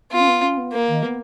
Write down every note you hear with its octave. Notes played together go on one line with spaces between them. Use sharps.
B3 F4
C#4
B3
C#4
B3
A#3
D#3
B3